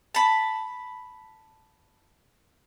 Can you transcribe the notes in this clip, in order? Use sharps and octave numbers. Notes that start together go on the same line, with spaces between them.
A5 B5